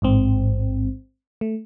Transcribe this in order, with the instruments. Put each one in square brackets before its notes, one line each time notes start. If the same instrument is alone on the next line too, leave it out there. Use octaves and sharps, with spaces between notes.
[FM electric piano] A1 G#2 C4
A3